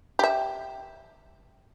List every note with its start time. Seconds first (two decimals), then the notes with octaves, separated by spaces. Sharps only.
0.19 G4 E5